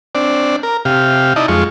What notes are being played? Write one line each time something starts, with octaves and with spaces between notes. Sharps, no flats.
C4 D4 D5
A#4
C3 G4 F5
D#4 E4 D5 D#5 A5
F2 G#3 F4 C#6